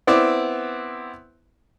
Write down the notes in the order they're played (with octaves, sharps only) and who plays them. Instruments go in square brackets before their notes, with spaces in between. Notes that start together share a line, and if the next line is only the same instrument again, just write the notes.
[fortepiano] B3 C4 E4 D5